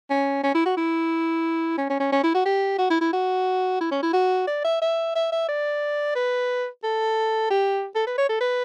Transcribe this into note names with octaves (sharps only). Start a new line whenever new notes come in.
C#4
C#4
E4
F#4
E4
C#4
C#4
C#4
C#4
E4
F#4
G4
F#4
E4
E4
F#4
E4
C#4
E4
F#4
D5
E5
E5
E5
E5
D5
B4
A4
G4
A4
B4
C#5
A4
B4